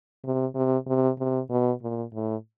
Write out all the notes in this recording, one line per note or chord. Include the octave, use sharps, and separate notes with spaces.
C3
C3
C3
C3
B2
A#2
A2